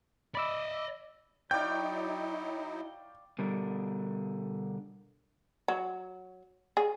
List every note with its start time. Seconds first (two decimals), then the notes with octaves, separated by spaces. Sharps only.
0.35 D5 D#5 B5 D6 E6
1.51 F#3 D#4 E4 D5 F5 G5 C#6 G6
3.39 B2 D3 G3 A#4
5.68 F#3
6.77 G#4